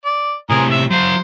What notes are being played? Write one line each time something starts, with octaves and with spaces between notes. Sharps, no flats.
D5
A2 C3 G#4 A#4
E5
F#3 C5 F5